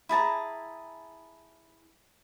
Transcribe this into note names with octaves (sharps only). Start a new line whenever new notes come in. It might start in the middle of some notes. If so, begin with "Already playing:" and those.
E4 G#4 A5 A#5